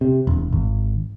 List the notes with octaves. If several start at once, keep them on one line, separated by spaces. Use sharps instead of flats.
C3
E1
G#1